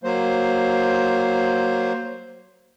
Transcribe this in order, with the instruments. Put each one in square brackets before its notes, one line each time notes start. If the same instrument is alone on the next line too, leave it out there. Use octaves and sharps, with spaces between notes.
[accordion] F#3 A#3 C5